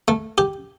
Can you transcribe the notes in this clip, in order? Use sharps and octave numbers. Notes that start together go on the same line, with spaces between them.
A3
G4